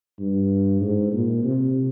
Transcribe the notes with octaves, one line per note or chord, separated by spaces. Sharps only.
G2
G#2
A#2
C3